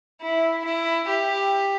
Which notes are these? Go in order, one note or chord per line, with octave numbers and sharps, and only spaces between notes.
E4
E4
G4